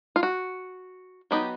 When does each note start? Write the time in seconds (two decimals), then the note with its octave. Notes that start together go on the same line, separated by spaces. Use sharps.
0.16 F4
0.23 F#4
1.31 F#3 B3 D#4 G4